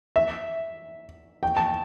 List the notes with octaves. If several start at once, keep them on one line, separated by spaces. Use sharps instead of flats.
E5
G5
A5